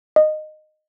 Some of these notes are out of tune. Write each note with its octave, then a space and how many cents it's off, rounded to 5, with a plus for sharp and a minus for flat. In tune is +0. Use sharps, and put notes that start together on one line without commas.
D#5 -15